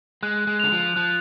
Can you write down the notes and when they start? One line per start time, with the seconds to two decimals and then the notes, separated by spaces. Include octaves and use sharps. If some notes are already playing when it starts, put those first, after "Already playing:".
0.23 G#3 F#6
0.47 G#3
0.60 D3 F7
0.72 F3
0.96 F3 F#6